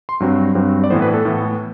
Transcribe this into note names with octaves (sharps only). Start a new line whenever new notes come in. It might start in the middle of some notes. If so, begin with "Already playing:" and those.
C6
G2 F#3 C4
G2 F#3 C4
D5
A2 E3 B3 C5
B4
A4
A2 E3 B3